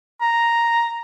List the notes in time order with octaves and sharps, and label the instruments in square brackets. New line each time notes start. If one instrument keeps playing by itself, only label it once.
[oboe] A#5